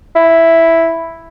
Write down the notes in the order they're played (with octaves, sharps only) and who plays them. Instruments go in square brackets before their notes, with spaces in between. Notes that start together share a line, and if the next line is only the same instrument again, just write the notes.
[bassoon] E4